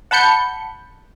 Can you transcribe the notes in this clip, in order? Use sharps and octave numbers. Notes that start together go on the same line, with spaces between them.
F#5 A5 B5 G6 C#7